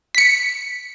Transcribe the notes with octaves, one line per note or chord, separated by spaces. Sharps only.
B6 C#7